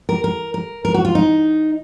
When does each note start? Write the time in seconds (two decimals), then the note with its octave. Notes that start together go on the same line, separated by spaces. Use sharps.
0.09 A#4
0.24 A#4
0.54 A#4
0.85 A#4
0.94 F#4
1.05 F4
1.15 D#4